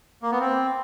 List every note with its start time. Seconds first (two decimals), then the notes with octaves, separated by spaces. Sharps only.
0.23 A#3
0.32 B3
0.40 C4